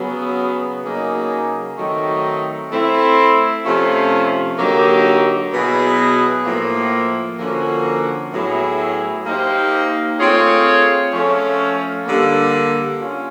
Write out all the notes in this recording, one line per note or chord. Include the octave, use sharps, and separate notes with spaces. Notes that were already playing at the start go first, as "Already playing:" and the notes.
Already playing: C#3 F#3 B3
C#3 F#3 A#3 D#4 G#4
D#3 F#3 A3 C4 D#4
A3 C4 E4
C3 F3 A3 C#4 F4
D3 F#3 A#3 D#4 G4
B2 F#3 B3 E4 G#4
A2 F3 A#3
D3 F3 A#3 C#4 F#4
A2 F#3 B3 E4 G#4
A#3 D#4 G4 C5
A3 C4 F4 G#4 C#5
F3 A3 C#4
D3 G3 A#3
C#4 F4